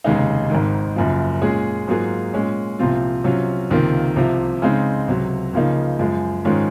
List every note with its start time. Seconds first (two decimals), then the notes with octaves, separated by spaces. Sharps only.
0.04 F1 D#2 C#3 G#3 D#4
0.50 G#1 G#2 D#3
0.96 F#1 F#2 F3
1.42 A#2 G#3 C#4 G#4
1.88 G#2 F#3 A#3 F4 G#4
2.33 A#2 G#3 C#4
2.79 C2 A#2 F3 C4 F4
3.24 C3 F#3 C#4 F4
3.70 C#2 C3 D#3 A#3 F4
4.16 C2 C3 F3
4.62 C#3 G#3 C4 D#4
5.07 C#2 C3 F#3
5.53 C#2 C#3 F3 A#3 D#4
5.99 F#2 F3 G#3
6.45 G#2 D#3 G#3 C#4 F4